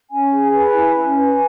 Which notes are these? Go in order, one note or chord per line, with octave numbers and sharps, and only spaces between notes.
C#4 G#5
G#4
B4 G#5
E4
C#4 G#5
B4